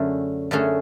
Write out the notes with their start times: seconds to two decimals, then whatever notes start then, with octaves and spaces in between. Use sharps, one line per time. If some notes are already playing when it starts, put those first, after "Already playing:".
Already playing: F#2 D3 A3 C#4 G#4
0.51 F#2 D3 A3 C#4 G#4